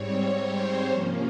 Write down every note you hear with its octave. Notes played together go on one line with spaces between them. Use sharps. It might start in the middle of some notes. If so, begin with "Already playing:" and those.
Already playing: G#2 G3 C4 C#5
C5
C3 F3 A#3 C#4